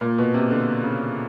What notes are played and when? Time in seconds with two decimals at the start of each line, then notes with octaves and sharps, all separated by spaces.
0.01 A#2
0.18 B2
0.34 C3
0.50 D3
0.83 C#3